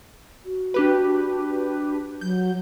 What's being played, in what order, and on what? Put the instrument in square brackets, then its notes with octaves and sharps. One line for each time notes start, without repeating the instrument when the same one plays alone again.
[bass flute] F#4
[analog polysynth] D4 G4 B4
[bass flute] F#3 [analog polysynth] G6